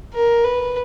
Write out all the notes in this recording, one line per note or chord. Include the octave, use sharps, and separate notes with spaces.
A#4
B4